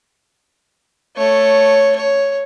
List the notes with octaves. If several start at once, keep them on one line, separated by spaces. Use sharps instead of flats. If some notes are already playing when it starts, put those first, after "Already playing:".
A3 C#5
C#5